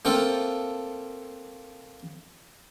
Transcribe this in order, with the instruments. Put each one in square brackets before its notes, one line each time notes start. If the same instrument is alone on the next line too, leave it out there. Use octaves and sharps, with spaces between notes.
[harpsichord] A3 A#3 C4 F4 A4